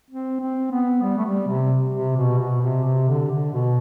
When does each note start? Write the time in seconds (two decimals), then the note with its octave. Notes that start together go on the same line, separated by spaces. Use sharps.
0.10 C4
0.40 C4
0.71 B3
1.02 G3
1.17 A3
1.25 G3
1.48 C3
1.94 C3
2.16 B2
2.39 B2
2.61 C3
2.84 C3
3.08 D3
3.31 D3
3.53 B2